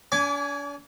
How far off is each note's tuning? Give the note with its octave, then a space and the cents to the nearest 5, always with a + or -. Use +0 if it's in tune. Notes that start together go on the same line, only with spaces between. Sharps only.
D4 -45 G#5 +0 D6 -30